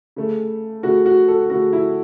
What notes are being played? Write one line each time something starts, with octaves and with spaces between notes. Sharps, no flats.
C#3 A3
C#3 A3 F#4
F#4
A4
C#3 A3 F#4
E4